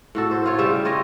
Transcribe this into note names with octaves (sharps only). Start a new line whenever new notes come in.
A2 F#4 A4
C5
F4 C#5
C#3 G3 G4 E5
F4 C#5 D#5